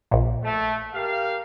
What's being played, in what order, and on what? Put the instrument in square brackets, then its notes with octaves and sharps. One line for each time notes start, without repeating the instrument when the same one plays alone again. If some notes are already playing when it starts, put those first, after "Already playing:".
[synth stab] A#1 A#2
[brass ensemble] A3
G4 A#4 F5